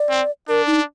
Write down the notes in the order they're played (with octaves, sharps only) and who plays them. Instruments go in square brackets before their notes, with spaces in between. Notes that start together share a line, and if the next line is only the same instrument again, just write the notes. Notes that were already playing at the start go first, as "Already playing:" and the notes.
Already playing: [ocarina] D5
[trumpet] C4
[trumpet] D4 [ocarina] A#4
[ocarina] D#4